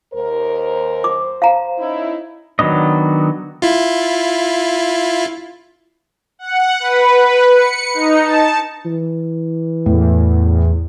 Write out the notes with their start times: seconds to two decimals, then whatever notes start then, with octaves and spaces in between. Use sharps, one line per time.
0.14 D#2 A#4 C5
1.04 D6
1.42 F5 A#5
1.78 C#4 D#4 E4
2.59 D#3 F#3 B3 D4 D#5
3.62 E4 F4
6.39 F#5
6.80 B4
7.21 B4
7.52 C#7
7.94 D#4
8.24 A5
8.85 E3
9.86 E2 A2